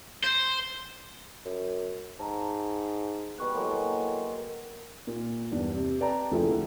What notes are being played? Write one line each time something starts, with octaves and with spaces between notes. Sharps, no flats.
C5
F#2
G#2 A5 A#5
B2 G3 B4 C#6 F#6
A2 F#3 G#3 A#3
A#2
E2 G2 D4
C3
B4 D5 G5 A5 A#5
F1 C#2 F3 A3 E4 G#4
D2